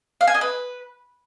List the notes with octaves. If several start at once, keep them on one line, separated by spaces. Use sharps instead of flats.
F5
G#5
D#5
B4